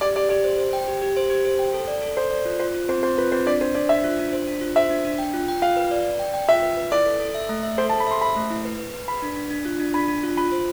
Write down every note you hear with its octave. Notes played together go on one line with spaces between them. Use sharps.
G4 D5
G4 D5
G4 D5
C5
C5
G5
G4
G4
C5
G4
C5
G5
A4
D5
A4
A4 C5
D5
F4
F4 C5
F4
C4 C5
C4 C5
F4 B4
C4 C5
D4 D5
D4 C5
D4 D5
D4 E5
F4
D4
C5
D4
F4
C5 E5
D4
D4
G5
F4
G5
F4 F5
B4
D5
D5
G5
G5
F4 E5
B4
B4
E4 D5
A4
A4
E5
A3
E5
A4 C5
A5
A4
B5
E5 C6
E5 B5
A3
E4
B4
B4
B4
B4 B5
D4
D4
D4
F4
D4
D4 B5
D4
F4
F4 B5
C5